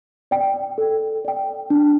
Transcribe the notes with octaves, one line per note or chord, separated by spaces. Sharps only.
D5 G5
A4
D5 G5
D4